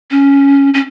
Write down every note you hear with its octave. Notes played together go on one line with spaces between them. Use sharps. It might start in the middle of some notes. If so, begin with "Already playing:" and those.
C#4
C#4